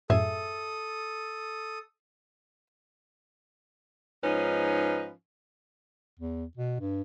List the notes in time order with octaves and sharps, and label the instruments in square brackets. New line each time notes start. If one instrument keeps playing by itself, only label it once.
[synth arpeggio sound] F#2 A2 [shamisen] G#4 E5 [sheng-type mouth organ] A4 D#6
[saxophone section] G#2 F3 C#4 D#4 B4
[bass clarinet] E2
B2
G2